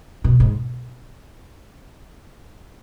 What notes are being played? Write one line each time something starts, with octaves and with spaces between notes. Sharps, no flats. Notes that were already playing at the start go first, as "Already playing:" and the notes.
B2
G#2